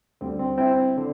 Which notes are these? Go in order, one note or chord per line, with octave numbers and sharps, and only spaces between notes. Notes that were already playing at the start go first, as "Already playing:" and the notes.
D2 D3 G3 C4
C4
C4 E4
D3